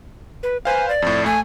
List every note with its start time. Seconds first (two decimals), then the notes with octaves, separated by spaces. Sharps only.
0.43 B4
0.65 B4 C5 F5 G#5
0.89 D5
1.02 F2 A2
1.26 A3 G#5